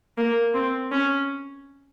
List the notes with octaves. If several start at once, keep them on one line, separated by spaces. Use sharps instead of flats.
A#3
C4
C#4